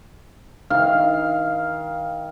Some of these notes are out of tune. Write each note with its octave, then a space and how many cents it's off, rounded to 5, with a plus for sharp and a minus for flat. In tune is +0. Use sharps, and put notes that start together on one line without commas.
D#3 +30 F5 +0